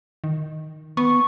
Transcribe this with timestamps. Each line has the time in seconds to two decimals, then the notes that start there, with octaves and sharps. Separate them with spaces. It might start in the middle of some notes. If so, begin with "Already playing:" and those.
0.24 D#3
0.97 B3 C#6